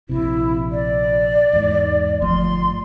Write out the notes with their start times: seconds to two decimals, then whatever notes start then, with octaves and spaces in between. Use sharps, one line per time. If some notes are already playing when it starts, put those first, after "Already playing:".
0.09 A#1 C3 E4
0.72 D5
1.53 E2 G#2
2.22 G1 F3 A3 C6